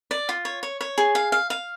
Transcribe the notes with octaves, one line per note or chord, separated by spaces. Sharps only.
D5
F4
C#5
C#5
C#5
G#4
F5
F5
F5